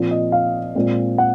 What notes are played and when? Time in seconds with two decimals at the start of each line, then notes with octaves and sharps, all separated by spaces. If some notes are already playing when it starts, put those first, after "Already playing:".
Already playing: A#2 F3 C4
0.11 D#5
0.32 F5
0.75 A#2 G#3 C4
1.18 F#5